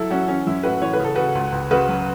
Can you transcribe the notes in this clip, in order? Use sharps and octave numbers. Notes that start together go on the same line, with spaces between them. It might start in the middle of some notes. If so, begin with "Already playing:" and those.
Already playing: F#3 E4 A4
F#3 C#4 F#4
E3 C#4
F#2 E4
A2 F#4 B4
E3 C#5
B4
C#3
A4
C#3 F#4 B4
C#2
C#2
C#3 F#4 B4
F#3